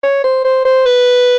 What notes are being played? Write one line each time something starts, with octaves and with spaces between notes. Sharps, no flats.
C#5
C5
C5
C5
B4